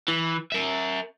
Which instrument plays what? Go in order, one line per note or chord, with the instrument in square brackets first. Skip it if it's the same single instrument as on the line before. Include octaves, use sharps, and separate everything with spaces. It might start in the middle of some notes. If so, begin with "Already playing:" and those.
[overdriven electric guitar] E3
A#4 E5